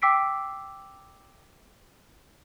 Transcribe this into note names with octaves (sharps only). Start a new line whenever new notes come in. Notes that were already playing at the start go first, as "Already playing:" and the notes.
G5 D6 E6 B6 C7 D7